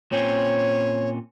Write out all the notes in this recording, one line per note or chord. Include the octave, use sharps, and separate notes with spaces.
A#2 C4 C#4 C#5